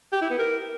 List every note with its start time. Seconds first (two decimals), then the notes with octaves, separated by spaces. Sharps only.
0.13 G4
0.21 E4
0.30 B3
0.39 A#4